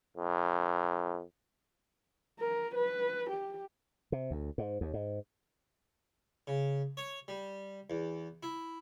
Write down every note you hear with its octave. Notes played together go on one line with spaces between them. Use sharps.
F2
A#4
B4
G4
C3
D2
G#2
D#2
G#2
C#3
C#5
G3
E2
E4